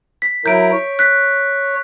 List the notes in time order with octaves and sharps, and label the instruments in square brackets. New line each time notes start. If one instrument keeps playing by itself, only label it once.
[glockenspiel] B6
[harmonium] F#3 E4 A#4 [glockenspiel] G6 D7
[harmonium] C#5
[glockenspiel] F#6 B6